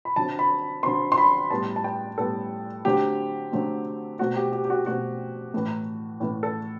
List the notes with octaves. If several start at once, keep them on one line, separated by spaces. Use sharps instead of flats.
B5
D3 F#3 C4 A5
B5
D3 F#3 C4 C6
C6
B5
A2 G3 B3 A5
A5
G5
A2 G3 B3 A4
D3 F#3 A3 C4 G4
D3 F#3 A3 C4
B2 A3 C4 F#4
G4
G4
G4
F#4
B2 A3 C4 F#4
A2 E3 A3
A2 E3 A3
A4